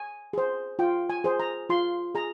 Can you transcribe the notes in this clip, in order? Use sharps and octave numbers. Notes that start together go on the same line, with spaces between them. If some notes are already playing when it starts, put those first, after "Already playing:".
Already playing: G#5
G#4 C5
F4 G5
G#5
G#4 C5
A#5
F4 C6
G#4 A#5